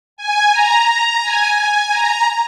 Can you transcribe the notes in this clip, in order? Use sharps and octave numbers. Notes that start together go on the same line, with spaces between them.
G#5
A#5
G#5
G#5
A#5